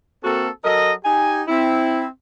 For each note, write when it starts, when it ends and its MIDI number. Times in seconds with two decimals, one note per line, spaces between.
0.24 0.49 58
0.24 0.49 60
0.24 0.49 66
0.24 0.49 69
0.64 0.91 54
0.64 0.91 69
0.64 0.91 70
0.64 0.91 75
1.05 1.40 63
1.05 1.40 67
1.05 1.40 80
1.48 2.04 60
1.48 2.04 64